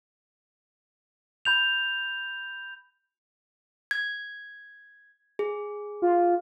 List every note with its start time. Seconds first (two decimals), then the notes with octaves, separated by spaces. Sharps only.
1.45 B5 G6 F7
3.91 G#6
5.39 G#4
6.02 F4